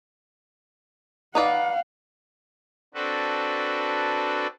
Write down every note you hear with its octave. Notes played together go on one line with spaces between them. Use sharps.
D#4 B4 D5 F5 F#5
C4 D4 F#4 A4 B4